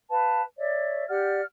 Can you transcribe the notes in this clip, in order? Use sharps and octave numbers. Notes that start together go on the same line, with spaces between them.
B4 F5 A5
C#5 D5 E5
G4 D5 F#5 F6